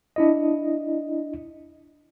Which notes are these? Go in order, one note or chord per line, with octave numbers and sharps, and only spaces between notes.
D4 E4 D#5